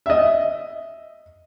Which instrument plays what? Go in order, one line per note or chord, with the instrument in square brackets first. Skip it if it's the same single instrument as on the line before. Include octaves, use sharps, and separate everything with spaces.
[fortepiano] D#5 E5